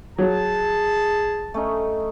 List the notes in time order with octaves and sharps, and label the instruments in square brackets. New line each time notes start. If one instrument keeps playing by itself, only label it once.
[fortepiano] F#3 [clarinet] G#4 [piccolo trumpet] A5
[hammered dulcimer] A3 C#4 D#4